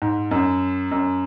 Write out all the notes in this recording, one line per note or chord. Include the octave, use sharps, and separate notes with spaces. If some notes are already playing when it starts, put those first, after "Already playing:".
G#2
F#2
F#2